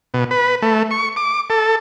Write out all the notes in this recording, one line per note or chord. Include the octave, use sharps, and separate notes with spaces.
B2
B4
A3
C#6
D6
A4